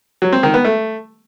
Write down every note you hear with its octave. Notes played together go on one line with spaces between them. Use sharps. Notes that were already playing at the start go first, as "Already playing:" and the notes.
F#3
C4
D#3
B3
A3